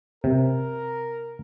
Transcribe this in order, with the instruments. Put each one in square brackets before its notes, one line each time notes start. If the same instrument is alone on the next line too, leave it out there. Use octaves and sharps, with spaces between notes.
[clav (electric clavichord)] C3 [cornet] A#4